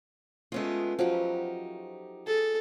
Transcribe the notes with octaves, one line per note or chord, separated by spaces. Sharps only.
G#3 A3 B3 C#4 F4 D#5
F3 F#3 D#4 G4 B4
G#4 A4